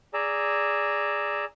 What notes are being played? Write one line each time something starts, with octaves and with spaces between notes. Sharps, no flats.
G#4 D5 A#5 E6